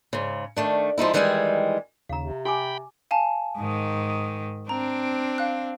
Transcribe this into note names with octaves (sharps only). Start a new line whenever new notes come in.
G#2 C#3
D#3 A3 D4
F3 G#3 D#4 E4
D#3 E3 G3 G#3 E5 G#5
D#2 C#3 F5 A#5
C3
G4 G5 G#5 B5 D6
F5 G#5 A5
G#2 D#3
C4 D4 A#5
F5 F#6